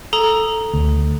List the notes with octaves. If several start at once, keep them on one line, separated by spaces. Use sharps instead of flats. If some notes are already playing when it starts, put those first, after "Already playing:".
A4 A#5 D#6
D2